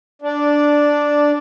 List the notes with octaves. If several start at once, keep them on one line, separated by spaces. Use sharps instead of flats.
D4